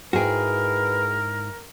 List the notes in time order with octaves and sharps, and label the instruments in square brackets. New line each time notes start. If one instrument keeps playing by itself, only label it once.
[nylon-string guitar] G#2 E4 G5 [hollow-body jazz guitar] F#4 G#4 [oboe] A#4 [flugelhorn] B4